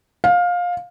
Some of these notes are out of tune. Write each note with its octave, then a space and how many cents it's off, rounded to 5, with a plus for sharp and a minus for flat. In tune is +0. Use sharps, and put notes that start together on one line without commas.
F5 +20